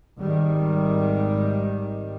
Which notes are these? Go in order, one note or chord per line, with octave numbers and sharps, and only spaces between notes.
G#1 D#3 G3